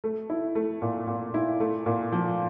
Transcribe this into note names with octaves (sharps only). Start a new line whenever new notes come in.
A3
E4
A3
A#2
A#2
E4
A3
A#2
F3